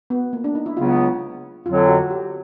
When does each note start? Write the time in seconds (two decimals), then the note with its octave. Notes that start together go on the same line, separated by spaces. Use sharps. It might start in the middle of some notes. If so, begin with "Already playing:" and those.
0.10 B3
0.33 A#3
0.44 D4
0.55 D#4
0.66 E4
0.77 C#2 C#3 F#3 B3 F4
1.65 F2 D3 F#3 F4
1.88 F#4
2.10 G4